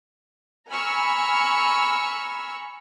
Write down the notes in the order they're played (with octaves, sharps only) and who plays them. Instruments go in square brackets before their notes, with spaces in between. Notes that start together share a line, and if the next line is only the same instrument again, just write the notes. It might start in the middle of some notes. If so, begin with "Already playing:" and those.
[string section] G#5 A#5 B5 C#6 E6 F6